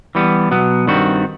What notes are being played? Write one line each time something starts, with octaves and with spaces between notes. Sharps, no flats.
E3 G3 B3
B2 F#3 B3
G2 D#3 G3 C4 F#4